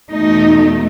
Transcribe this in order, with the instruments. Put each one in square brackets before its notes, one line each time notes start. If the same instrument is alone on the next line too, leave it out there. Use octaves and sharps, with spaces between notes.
[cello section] E2 B2 A3 D#4